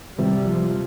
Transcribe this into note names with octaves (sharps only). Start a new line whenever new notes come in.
C3 G3
F3